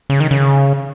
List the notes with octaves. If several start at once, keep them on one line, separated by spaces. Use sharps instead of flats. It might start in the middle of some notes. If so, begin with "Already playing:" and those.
C#3
D#3
C#3